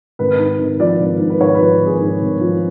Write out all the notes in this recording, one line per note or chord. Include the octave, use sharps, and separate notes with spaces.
G#1 B4
G#2
G#1
F3 D5
G#1
G#2
B4
G#1 C#5
B4
F3
G#1 G#4
G#2
G#1
F3